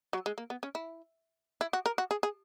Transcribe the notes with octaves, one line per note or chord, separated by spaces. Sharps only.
F#3
G#3
A#3
B3
C#4
E4
E4
F#4
A#4
F#4
G#4
G#4